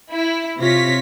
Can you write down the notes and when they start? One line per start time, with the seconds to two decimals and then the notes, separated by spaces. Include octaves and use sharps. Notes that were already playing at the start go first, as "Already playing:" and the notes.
0.11 E4
0.59 C3 F4 C#5 A#6 B6